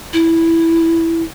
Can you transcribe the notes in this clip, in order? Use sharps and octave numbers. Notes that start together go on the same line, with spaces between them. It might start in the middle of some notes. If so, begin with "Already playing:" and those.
E4